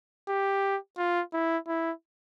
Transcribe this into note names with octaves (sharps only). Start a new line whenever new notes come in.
G4
F4
E4
E4